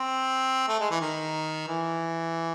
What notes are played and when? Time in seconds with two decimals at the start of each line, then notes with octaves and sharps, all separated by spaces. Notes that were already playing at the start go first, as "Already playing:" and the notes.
Already playing: C4
0.69 A3
0.80 G#3
0.91 E3
1.01 D#3
1.68 E3